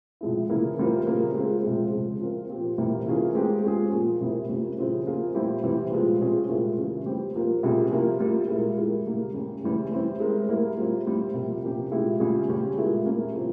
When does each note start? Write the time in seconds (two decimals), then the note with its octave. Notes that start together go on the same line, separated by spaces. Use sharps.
0.21 C3 F3 G#3 E4
0.49 C#3 E3 A#3 E4
0.78 E3 G3 C4 F4 A#4
1.07 C#3 F3 A#3 E4
1.35 G#3 C4 F4 G#4
1.64 C3 F3 G#3
1.92 C#3 F3 G#3
2.21 F3 C4 F4 A#4
2.49 A#2 F3 C4 G4
2.78 C3 E3 G3 A#3
3.07 E3 A#3 C#4 F4 G#4
3.35 G#3 C4 G4
3.63 G#3 C#4 F4 G#4
3.92 A#2 F3 A#3
4.21 C3 G3 C4 E4 A#4
4.49 G3 A#3 C#4 F4
4.78 C#3 F3 C4 E4 G4
5.07 F3 A#3 F4 G#4
5.35 A#2 G3 C4 E4 G4
5.64 C3 E3 G3
5.92 A#2 F3 G#3 C4
6.21 C3 G3 C#4 F4 G#4
6.49 A#2 G#3 E4 G4 A#4
6.77 C#3 E3 G3 C#4 F4
7.06 G3 C4 G4
7.35 F3 A#3 F4 A#4
7.63 C3 G3 C#4 F4 G#4
7.92 F3 A#3 E4 G4 A#4
8.20 G3 A#3 F4
8.48 A#2 G#3 E4 A#4
8.77 F3 G#3 E4 G4 A#4
9.06 C#3 G3 A#3 E4
9.34 G3 C#4 G4
9.63 C#3 E3 G3 C#4
9.92 G3 C4 E4
10.20 G#3 E4 A#4
10.49 G3 A#3 E4 A#4
10.77 G3 C4 F4
11.06 G3 A#3 E4
11.34 C3 F3 A#3 F4
11.62 C3 F3 A#3 C#4 G4
11.91 A#2 G#3 E4 G4
12.20 C#3 G3 C#4 F4 G#4
12.48 C#3 G3 C#4 G4
12.77 A#2 G#3 E4 A#4
13.05 G3 A#3 C#4 E4
13.34 C#3 F3 C4